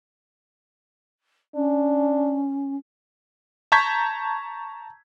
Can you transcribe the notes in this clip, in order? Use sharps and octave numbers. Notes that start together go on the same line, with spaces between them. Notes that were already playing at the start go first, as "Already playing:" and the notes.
C#4 D4
A5 A#5 C#6 G6 G#6 B6